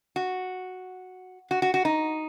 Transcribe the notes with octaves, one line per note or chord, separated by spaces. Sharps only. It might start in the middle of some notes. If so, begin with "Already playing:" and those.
F#4
F#4
F#4
F#4
D#4